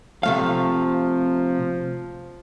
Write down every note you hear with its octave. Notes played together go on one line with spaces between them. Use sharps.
C3 F3 A3 F5